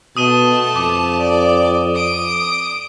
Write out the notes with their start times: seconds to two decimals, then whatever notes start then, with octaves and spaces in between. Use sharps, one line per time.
0.17 B2 A3 A5 D#6 D#7 G7
0.76 F2 D6
1.20 D5
1.96 D#6 D7